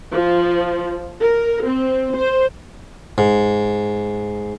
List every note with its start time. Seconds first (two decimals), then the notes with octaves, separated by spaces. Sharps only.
0.12 F3
1.21 A#4
1.65 C4
2.16 C5
3.18 G#2